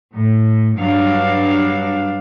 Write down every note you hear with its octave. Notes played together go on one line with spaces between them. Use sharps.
A2
G2 F#3 D4 F5